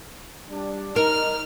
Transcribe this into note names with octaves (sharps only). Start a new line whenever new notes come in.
G3 D4
D#4 A#4 F6